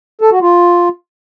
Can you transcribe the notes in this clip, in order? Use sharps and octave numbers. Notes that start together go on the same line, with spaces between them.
A4
F#4
F4